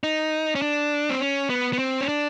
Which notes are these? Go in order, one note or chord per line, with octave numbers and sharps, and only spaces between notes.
D#4
C#4
D4
C4
C#4
B3
B3
C4
C#4
D4